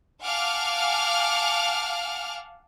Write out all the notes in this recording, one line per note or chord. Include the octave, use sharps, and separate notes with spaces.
F5 F#5 G#5 A5 D6 F6